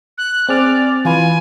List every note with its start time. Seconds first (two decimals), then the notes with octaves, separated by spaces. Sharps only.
0.18 F#6
0.48 C4 G#4 D5 F6
1.05 E3 F4 B4 G#5